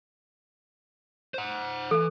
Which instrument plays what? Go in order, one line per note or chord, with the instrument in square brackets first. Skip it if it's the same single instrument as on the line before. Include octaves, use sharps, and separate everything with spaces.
[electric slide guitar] C5 F#5
[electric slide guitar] E3 [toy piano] A4